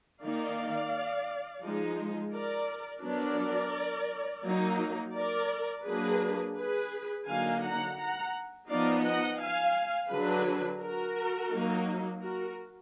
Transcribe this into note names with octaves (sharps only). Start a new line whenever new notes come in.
D#3 A#3 D#4 D5 F5
F3 G#3 D#4
A#4 D5
F#3 B3 D4 A#4 D5
F#3 A#3 D#4
A#4 D5
F#3 A#3 D4 G#4 B4
G#4 B4
D3 F#3 A#3 D#4 F5 G#5
F#5 A#5
F#5 A#5
F3 B3 D#4 D5 F5
D#5 F#5
F5 G#5
D3 F#3 D4 G#4 B4
F#4 A#4
F#3 A#3 D#4
F#4 A#4